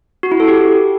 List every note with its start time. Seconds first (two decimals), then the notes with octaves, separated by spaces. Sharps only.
0.23 F#4
0.32 E4
0.40 A4
0.48 G4